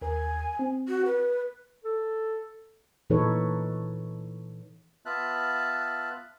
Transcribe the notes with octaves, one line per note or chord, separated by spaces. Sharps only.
D#2 A#4 G#5
C4
F#4
B4
A4
A#2 E3 D#4 A4 B4 C#5
B3 F4 E5 A5 F#6